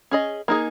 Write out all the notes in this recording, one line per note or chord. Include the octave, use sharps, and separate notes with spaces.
C#4 G#4 D#5
A#3 D#4 G#4